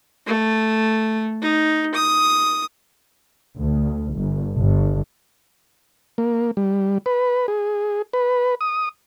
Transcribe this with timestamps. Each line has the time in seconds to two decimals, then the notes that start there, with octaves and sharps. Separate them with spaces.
0.26 A3
1.42 D#4
1.95 D#6
3.55 D2
4.14 G1
4.58 G1
6.18 A#3
6.57 G3
7.06 B4
7.48 G#4
8.13 B4
8.61 D#6